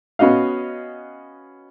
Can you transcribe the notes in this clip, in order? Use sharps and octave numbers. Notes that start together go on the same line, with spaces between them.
B3 C#4 F#4 D#5 F5